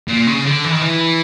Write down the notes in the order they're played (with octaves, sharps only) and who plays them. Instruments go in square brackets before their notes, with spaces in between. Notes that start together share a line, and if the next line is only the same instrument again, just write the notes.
[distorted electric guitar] A#2
C#3
D3
E3
D#3
E3